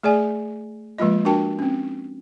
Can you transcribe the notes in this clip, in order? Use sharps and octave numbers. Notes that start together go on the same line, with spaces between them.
A3 G#4 D5 G#5
F3 G#3 A#3 F4 D#5
D4 F#4 A#4 G5 A5
C4 C#4